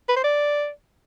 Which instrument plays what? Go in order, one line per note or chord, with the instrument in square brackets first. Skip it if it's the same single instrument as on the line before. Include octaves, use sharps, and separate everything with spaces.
[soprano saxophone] B4
C5
D5